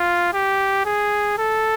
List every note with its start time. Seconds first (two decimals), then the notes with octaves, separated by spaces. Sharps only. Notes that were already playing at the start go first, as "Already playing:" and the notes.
Already playing: F4
0.34 G4
0.85 G#4
1.38 A4